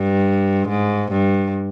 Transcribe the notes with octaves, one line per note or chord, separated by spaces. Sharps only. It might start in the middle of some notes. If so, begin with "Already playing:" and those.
Already playing: G2
G#2
G2